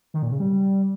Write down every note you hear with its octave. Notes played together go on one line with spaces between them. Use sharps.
D#3
A#2
C#3
G3